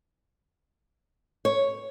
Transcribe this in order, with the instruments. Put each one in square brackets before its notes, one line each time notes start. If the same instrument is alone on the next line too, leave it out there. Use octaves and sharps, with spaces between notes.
[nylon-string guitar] C#5